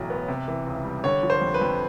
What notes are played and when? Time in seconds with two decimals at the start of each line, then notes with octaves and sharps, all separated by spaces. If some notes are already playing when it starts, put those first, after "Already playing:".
Already playing: B1 E2 A2 F#3
0.10 B3
0.28 C3
0.48 E3
0.67 C#2
0.85 G3
1.04 D3 C#5
1.23 F3
1.30 C5
1.41 F2
1.54 B4
1.61 F2